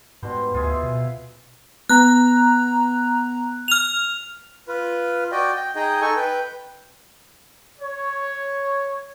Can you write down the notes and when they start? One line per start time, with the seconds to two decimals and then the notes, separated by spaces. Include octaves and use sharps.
0.22 G#2 B2 G3 C5
0.54 D2 F4 G#4 E5
0.83 B2
1.89 B3 A#5 F#6
3.68 F6 F7
4.68 F4 B4
5.32 F#4 D5 D#5 G5
5.54 G5
5.76 D#4 G#4 D#5 G5
6.02 D#4 A4 G#5 C#6
6.17 B4 G5
7.80 C#5